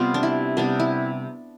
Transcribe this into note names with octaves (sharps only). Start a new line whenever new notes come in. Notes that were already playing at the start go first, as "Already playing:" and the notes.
Already playing: C3 G3 B3 F4
D4
E4
C3 G3 B3 D4
E4